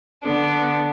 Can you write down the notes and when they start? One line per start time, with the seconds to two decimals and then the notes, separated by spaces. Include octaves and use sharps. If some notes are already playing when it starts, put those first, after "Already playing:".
0.24 D3 B3 D4 A4